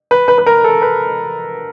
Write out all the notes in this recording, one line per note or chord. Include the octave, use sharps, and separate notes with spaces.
B4
B4
B4
A#4
A4
B4